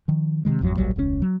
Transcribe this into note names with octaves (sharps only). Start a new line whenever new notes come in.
D#3 F3
C3 D#3 E3 G#3
G#1 F2 C#3 F#3
D1 A#1 F#3 G3
E1 C#2 A#2 C#4
F#3